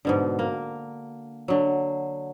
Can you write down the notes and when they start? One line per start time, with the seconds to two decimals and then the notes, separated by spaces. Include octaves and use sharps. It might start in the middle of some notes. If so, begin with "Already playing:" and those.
0.05 G#2 B2 D3
0.39 A#3
1.48 D3 F#3